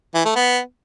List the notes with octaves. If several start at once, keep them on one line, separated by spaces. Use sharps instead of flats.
E3
A3
B3